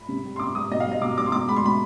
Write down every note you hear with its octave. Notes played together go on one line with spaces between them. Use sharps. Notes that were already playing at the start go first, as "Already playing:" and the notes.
Already playing: B5
C3
G3
C6
C3 D6
G3 D#6
B2 D#5
F5
G3
D#5
B2 D6
G3 D6
C6
B2 D6
G#3 B5
C6
B2 B5